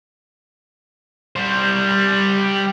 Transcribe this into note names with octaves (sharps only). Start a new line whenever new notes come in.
G3 C5